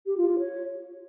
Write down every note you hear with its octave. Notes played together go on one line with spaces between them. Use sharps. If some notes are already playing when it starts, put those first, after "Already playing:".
G4
F4
F4
C#5